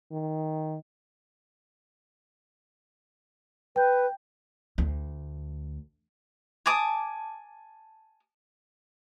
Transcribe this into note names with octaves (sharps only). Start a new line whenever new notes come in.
D#3
B4 G5 G6
D2
G#5 A5 D6 D#6